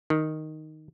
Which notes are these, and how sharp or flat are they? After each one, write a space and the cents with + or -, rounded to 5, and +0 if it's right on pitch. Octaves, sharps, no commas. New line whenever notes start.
D#3 +0